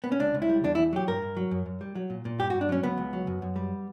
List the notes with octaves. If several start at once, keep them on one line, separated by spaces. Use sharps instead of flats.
B3
C#4
C#2 D4
C#2
E4
G3
E2 D4
E4
E2
F#3 G4
G2 A#4
G2
F#3
F#2
F#2
G3
F#3
A#2
A#2
G2 G4
F#4
G2
D4
F#3 C#4
C#2 B3
C#2
F#3
F#2
F#2
G3